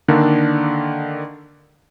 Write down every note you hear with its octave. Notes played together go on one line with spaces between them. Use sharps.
D3 D#3 A#3 D4 A4